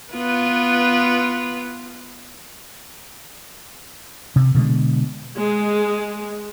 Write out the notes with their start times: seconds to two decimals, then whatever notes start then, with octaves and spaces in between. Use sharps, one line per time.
0.13 B3 F4 B4
4.36 C3
4.55 B2 D3 F3 G#3
5.36 G#3